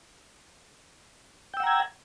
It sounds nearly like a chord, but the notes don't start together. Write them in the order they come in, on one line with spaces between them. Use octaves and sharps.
G5 E6 F#5 A#5 G#6